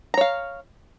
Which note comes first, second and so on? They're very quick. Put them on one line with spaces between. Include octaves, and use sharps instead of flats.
A#5 C#5 F5